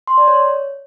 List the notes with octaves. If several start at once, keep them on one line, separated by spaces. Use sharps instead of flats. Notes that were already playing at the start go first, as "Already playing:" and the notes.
C6
D5
C#5